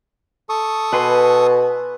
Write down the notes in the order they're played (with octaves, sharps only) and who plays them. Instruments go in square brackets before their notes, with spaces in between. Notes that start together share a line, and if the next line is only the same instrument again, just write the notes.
[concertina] A4 C#6 D#6
[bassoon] B2 [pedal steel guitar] B4 G#5 C6